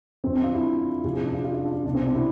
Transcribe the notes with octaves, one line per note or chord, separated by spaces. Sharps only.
F2 D3 F3 C4
D4
F4
E4
F2 C3 F3 G#4
G#4
D4
F4
F4
F4
D4
F4
C2 B2 D4
C4
D4
E4